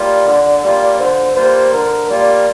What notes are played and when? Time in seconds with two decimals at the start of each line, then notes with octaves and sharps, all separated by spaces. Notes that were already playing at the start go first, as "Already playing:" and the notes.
Already playing: G3 A#3 F4 D5
0.26 D3
0.63 G3 A#3 F4
0.99 D3 C5
1.36 G3 A#3 F4 C5
1.73 D3 A#4
2.09 G3 A#3 F4 D5